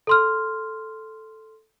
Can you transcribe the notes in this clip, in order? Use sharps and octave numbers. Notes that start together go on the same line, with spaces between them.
A4 C6 F6